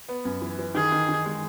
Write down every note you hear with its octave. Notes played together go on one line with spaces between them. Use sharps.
B3
F#2
E3
E3
D#3 G#4
D#3
D#3
G#3